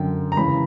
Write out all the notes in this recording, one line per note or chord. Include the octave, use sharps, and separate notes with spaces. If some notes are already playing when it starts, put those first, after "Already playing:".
Already playing: F#2 D3 G5
A#5
E2 C#3 E3 B5